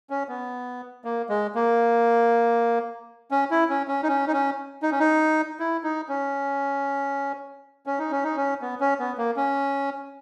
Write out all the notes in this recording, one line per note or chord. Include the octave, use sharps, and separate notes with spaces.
C#4
B3
A#3
G#3
A#3
C#4
E4
C#4
C#4
D#4
C#4
D#4
C#4
D#4
C#4
D#4
E4
D#4
C#4
C#4
D#4
C#4
D#4
C#4
B3
C#4
B3
A#3
C#4